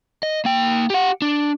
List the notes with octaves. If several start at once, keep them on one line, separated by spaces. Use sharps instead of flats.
D#5
A#3 G5
G4 F#5
D4